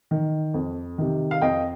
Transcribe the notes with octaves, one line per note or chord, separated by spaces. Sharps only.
D#3
F2
C3 D#3
F5
F2 D#5 G5